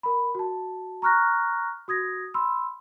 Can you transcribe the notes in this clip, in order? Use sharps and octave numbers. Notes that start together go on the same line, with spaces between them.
A#4 B5
F#4 A5
A#5 C#6 F6 F#6 A#6
F#4 D#6 G#6 A#6
B5 C6 E6